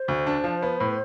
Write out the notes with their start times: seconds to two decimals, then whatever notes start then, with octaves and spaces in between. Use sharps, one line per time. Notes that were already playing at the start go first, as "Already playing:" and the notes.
Already playing: C5
0.08 D2
0.27 D4
0.44 F3
0.62 B3
0.80 A2